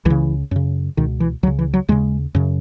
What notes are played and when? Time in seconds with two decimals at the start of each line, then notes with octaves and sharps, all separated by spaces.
0.05 C#2 C#3 E3
0.51 F#2 C#3
0.97 C#2 B2 D#3
1.20 E3
1.43 C#2 F#3
1.47 C#3
1.59 E3
1.74 F#3
1.88 D#2 C#3 G#3
2.35 F#2 C#3